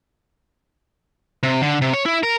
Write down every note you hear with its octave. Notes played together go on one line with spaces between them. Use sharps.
C3
D3
C3
C#5
E4
A#4